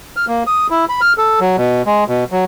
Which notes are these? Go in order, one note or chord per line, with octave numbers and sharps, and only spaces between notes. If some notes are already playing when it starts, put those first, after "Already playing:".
F6
A#3
D#6
E4
B5
F6
A4
F#3
B2
G#3
B2
F#3